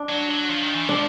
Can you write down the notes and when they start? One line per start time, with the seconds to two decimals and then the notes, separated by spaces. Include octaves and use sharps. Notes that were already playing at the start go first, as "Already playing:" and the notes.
Already playing: D4
0.09 F#3
0.30 F#3
0.50 F3
0.62 D#3
0.75 E3
0.89 F3 D4